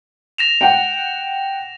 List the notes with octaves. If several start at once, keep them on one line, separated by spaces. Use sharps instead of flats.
A#6 E7 F7
F#5 G5